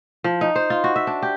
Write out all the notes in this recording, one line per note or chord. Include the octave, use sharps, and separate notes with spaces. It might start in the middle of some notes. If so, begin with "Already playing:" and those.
F3
D#4
C5
F4
F#4
E5
D4
G4